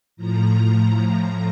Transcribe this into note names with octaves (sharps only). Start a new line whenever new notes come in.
A2 F3 A#5